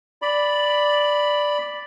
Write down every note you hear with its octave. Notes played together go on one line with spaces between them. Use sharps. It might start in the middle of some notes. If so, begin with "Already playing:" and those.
D5 B5